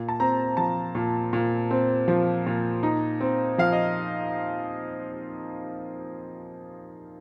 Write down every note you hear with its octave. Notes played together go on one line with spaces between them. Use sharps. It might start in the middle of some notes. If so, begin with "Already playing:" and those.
Already playing: A#2
A5
C4 A#5
F3 A5
A#2
A#2
C4
F3
A#2
D#4
C4
F3 F5
D#5